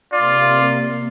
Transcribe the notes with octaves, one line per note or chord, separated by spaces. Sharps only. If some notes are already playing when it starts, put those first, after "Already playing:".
C3 A#3 F4 D5